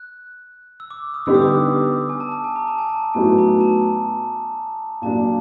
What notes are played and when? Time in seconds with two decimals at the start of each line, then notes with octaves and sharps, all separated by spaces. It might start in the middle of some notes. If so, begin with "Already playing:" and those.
Already playing: F#6
0.80 E6
0.91 D6
1.14 D#6
1.26 D3 G3 B3 D#4 G4 E6
1.34 D#6
1.42 D6
1.48 D#6
2.09 G#5
2.20 A5
2.32 A5
2.44 G#5
2.56 A#5
2.67 A5
2.78 G#5
2.89 A5
3.14 A2 F#3 B3 D#4 F#4 G#5
3.38 A#5
3.61 A5
5.02 A#2 F#3 A#3 D4 A5